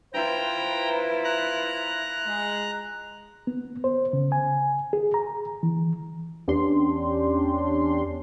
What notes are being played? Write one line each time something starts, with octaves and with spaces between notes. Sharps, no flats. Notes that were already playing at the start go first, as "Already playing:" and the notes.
E4 F4 B4 C5 G5 A#5
A#5 F#6
G#3
B3
C5
C#3
G#5
G#4
A#5
E3
E2 B3 C#4 D4 G4 C6